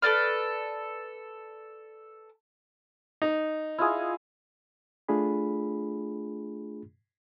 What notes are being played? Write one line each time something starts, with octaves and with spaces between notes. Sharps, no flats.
A4 B4 D5 F6
D#4
E4 F4 G#4
A3 D4 F4 G#4 B5